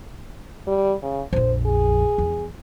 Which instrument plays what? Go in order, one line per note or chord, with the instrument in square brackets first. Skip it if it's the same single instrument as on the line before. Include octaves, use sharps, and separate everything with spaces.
[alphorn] G3
C#3
[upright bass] A#1 F2 [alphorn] C5
[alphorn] G#4
[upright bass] E2